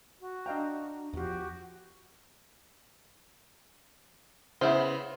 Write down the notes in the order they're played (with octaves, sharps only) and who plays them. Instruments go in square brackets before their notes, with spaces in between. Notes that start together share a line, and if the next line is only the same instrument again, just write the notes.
[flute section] F#4
[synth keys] D4 A#5 [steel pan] D#5 F5 G5
[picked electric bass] E2 F3 [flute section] F#4 G4
[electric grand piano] C#3 [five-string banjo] B3 E4 C5